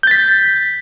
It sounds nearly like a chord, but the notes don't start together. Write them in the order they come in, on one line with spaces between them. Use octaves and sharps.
G6 A6 B6